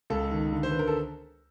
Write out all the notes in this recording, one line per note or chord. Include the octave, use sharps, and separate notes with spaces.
C#2 A4
D#3
D3
C5
D3 B4
A#4
A4